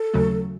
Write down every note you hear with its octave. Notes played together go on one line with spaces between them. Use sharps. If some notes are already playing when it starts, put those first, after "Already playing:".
Already playing: A4
D#2 C#3 F#3 A3